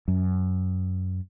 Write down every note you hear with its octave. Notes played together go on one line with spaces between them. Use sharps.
F#2